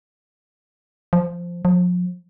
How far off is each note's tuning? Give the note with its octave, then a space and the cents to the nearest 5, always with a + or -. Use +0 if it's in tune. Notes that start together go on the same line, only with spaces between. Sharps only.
F3 -5
F3 +40